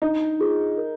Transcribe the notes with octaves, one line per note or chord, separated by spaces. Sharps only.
D4 D#4
F4 G#4
A#4